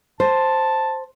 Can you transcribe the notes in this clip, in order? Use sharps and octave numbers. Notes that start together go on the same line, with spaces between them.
C5 A5